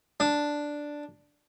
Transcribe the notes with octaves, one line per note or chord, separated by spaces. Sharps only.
D4